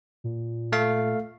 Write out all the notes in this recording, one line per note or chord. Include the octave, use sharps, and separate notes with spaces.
A#2
A3 F5